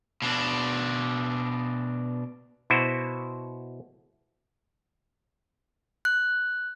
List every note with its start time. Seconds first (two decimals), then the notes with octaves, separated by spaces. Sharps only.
0.22 B2 D4
2.70 B2 E4 F#4 C5
6.05 F#6